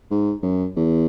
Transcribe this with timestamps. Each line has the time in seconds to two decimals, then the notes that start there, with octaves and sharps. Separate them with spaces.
0.11 G#2
0.43 F#2
0.76 E2